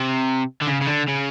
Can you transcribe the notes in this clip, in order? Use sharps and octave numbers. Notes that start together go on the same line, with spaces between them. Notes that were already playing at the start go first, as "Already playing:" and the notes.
Already playing: C3
D3
C#3
C#3
D3
C#3